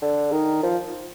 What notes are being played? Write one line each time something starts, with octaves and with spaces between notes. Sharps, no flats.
D3
D#3
F3